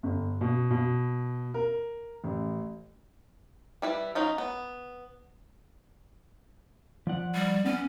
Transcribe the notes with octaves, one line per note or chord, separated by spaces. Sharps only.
G1
B2
B2
A#4
A1
G3 E4 B4
F#3 C#4 D#4 F4
B3
F3 D5 F#5
G3
B3 C#4 F#5